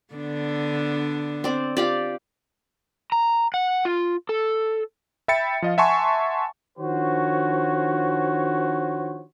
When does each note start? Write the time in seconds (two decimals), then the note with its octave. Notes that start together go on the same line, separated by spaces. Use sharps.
0.14 D3 B3 D4
1.44 C4 D5
1.77 F4 G4 D5
3.12 A#5
3.54 F#5
3.85 F4
4.29 A4
5.28 E5 G5 B5 A6 C#7
5.62 F3 D#5 F5
5.78 E5 F#5 G#5 A5 C6 C#6
6.78 D#3 F3 D4 F#4 C5 C#5